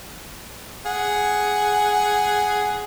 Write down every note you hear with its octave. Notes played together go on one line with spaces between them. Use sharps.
G#4 F#5